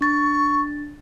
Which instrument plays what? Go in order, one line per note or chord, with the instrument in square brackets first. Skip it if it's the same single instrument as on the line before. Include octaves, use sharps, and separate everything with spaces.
[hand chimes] D4 A6 [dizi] C#6